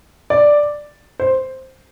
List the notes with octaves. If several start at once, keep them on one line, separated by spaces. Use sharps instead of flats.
D5
C5